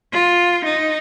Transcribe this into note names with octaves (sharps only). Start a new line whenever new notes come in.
F4
D#4